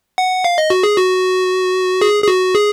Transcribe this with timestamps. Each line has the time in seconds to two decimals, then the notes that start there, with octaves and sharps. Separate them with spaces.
0.18 F#5
0.44 F5
0.58 D#5
0.70 F#4
0.83 G#4
0.98 F#4
2.01 G#4
2.24 G#4
2.28 F#4
2.55 G#4